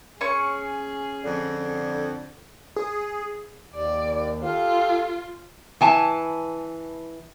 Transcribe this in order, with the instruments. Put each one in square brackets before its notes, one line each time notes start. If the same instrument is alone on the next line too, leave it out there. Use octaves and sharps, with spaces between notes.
[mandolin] C#4 C#6 [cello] G#4
[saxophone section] F2 D3
[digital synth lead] G#4
[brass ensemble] D#2 [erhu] D5
[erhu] F4 [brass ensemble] G4 A4 F5
[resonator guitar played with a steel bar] E3 G#5 A5